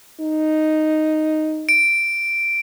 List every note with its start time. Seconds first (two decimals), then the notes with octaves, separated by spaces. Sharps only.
0.20 D#4
1.69 D7